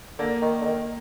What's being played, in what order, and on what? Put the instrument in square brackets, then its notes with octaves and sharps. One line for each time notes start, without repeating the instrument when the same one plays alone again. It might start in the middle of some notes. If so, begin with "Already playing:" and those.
[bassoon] D3 [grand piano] A#3
[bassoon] D#3
D3
D#3